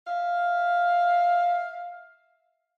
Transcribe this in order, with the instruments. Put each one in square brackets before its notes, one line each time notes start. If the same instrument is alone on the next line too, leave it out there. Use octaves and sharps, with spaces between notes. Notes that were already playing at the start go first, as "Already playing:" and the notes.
[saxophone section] E5 F5